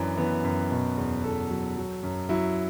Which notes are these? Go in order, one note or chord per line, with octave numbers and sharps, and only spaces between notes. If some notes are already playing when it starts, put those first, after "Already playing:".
Already playing: F#2 E3 D4
E3 B3
F#2
B2
E2
E2 A4
F#3
F#3
F#2
F#3 E4